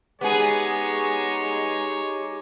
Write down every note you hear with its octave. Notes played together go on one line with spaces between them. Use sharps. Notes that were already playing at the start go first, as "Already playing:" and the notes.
G#3 B3 D#4 G4 G#4 C#5